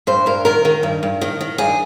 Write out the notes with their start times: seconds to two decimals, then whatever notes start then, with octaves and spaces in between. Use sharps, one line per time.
0.07 G2 C5
0.26 G2 A#4
0.45 D#3 A#4
0.65 D#3
0.83 G2
1.03 G2
1.21 D#3
1.41 D#3
1.58 G2 G#4